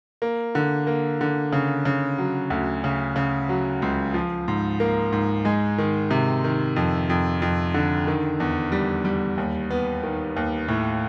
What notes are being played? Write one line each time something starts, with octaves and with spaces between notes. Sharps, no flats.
A#3
D3
A#3
D3
C#3
C#3
F#3
D2
C#3
C#3
F#3
C#2
F3
G#2
A#3
G#2
G#3
D#3
C3
D#3
F2
F2
F2
D3
D#3
E2
G3
G3
D#2
B3
D#3
D#2
A2